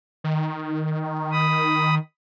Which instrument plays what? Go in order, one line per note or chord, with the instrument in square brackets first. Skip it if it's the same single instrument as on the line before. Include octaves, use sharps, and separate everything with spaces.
[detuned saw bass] D#3
[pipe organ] B5 D#6